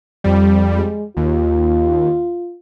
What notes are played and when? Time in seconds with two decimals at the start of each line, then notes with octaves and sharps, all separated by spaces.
0.24 F2 G3
0.75 G#3
1.17 D#2 F4